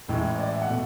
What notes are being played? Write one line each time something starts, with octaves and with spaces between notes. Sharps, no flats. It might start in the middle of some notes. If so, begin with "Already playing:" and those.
A1 A2 E3 G#3
D5
E5
F#5
B2 A3